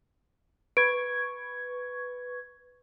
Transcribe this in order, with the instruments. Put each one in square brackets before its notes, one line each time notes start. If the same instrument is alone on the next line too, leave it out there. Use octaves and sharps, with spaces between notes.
[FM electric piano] B4 C#6 G#6 [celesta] D7